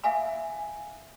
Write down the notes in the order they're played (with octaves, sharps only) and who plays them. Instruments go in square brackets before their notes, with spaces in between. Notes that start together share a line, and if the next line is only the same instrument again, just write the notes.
[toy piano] E5 F5 G#5 B5